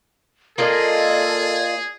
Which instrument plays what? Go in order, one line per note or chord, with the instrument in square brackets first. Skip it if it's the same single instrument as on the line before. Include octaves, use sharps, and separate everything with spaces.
[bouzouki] A#3 F4 D#5 [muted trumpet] G#4 [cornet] A4 [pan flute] D5